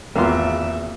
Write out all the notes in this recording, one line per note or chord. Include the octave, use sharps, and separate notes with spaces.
G#1 E2 A#3 B3 F4 E5